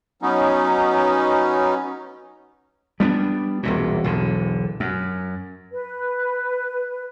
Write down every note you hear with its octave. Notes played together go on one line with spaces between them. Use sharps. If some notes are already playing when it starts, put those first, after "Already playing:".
F#3 B3 C#4 D#4
G3 B3 D4
E1 C2 A#2
E1 B1 D3
F#2
B4